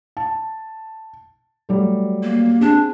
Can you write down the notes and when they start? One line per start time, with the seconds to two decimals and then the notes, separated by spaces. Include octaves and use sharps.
0.17 A5
1.69 F#3 G3 A3
2.23 A#3
2.61 C4 D4 G#4